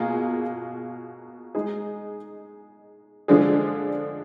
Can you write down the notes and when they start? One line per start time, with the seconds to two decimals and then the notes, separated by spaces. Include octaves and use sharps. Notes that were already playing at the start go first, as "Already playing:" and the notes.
Already playing: B2 A#3 F4 G#4
1.55 G#3 D#4 G#4
3.28 D3 F3 G#3 D4 G#4